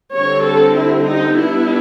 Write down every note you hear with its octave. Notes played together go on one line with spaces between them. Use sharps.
D3 G3 C4 C#5
A4
E4
D#4
G3 B3 D4 E4